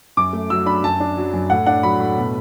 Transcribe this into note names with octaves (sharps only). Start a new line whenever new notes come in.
F#2 D6
A3
F#3 E6
D4 B5
F#2 A5
D4
F#3
F#2
A2 F#5
D4 F#5
F#3 B5
A2
B2